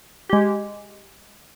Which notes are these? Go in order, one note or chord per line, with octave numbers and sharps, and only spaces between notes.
G#3 G4